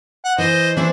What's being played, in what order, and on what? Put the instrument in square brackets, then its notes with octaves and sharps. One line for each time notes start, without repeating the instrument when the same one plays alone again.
[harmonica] F#5
[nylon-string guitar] E3 [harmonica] C5 D#5
[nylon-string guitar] E3 E4 C5 [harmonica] D4